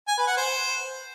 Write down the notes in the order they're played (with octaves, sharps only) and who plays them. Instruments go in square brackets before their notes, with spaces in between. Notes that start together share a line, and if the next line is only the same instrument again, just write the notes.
[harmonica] G#5
B4
F#5
C5